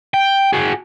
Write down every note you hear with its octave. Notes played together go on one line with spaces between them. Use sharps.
G5
F#4 G#4